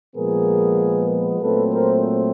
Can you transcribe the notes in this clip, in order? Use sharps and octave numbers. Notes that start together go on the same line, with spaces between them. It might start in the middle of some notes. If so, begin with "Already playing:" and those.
A#2 F3 G#3 B3 G#4 A#4
A#2 F#3 A3 C4 A4 B4
A#4 C5